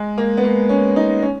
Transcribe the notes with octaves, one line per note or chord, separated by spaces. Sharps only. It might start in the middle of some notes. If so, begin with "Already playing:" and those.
Already playing: G#3
A#3
B3
A#3
C#4
D#4
C#4